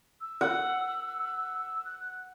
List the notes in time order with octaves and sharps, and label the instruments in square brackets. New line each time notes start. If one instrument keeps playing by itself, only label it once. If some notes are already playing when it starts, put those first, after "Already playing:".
[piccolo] E6
[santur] F#5
[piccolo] F#6